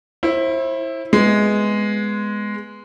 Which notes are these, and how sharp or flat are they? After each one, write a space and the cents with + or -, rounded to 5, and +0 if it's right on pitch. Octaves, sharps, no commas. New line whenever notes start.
E4 -5 C5 +35
G#3 +0 B3 +0